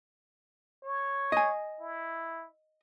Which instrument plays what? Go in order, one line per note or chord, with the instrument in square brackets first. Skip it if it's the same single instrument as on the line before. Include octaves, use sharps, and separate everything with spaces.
[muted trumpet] C#5
[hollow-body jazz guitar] D#5 G#5
[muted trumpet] E4